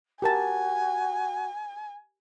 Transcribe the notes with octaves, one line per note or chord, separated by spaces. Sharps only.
F#4 G4 A#4 G#5 A5